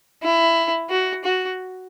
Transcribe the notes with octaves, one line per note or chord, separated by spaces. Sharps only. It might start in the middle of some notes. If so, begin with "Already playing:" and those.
E4
F#4
F#4